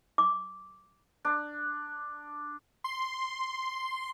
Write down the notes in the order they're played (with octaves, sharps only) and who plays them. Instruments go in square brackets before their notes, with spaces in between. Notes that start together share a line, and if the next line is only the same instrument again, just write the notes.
[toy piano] D6
[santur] D4
[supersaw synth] C6